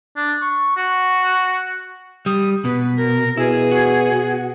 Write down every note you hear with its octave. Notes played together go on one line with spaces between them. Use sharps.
D4
C#6
F#4
G3 D#6
B2 B4
A#4
B2 E4 G#4
F#4
B2